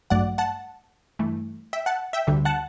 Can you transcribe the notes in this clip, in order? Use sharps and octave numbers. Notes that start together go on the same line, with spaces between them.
A1 G2 F#3 A3 D5 F#5
F#5 A5
G2 E3 A3
E5 G5
F#5 A5
E5 G5
D2 D3 G3
F#5 A5